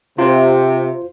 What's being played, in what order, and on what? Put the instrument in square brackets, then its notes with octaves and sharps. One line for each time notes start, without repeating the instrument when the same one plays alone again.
[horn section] C3 [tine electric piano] F4 C5